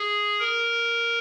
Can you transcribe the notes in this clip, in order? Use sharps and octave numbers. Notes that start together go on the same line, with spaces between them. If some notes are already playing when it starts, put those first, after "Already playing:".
Already playing: G#4
A#4